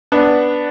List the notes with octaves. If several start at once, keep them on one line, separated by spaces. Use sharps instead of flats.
B3 D4